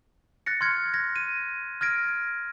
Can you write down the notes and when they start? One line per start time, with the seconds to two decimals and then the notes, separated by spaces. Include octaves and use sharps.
0.46 F#6 A6 A#6 C#7
0.61 C6 F6 G#6 C#7
0.94 G#6 A#6
1.16 D#7
1.81 F6 G#6 A#6 D7